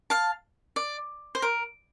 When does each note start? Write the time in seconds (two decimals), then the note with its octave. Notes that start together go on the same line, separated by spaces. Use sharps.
0.10 F5 A5
0.76 D5
1.35 C5
1.42 A#4